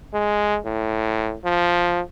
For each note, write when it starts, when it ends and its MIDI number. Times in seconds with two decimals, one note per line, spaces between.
0.14 0.58 56
0.65 1.34 45
1.45 2.01 53